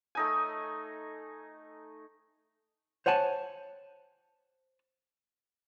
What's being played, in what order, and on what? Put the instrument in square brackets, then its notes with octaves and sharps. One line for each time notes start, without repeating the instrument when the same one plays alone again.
[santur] A3 D#4 G#5
[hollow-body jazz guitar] C5 C#5 F#5 G#5 A5